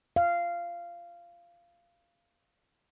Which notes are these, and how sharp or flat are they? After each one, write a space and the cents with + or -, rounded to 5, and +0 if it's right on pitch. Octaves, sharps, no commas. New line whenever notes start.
F5 -15